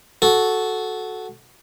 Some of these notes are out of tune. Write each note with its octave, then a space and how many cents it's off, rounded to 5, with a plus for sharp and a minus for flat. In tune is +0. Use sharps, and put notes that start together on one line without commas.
F#4 +0 A4 -10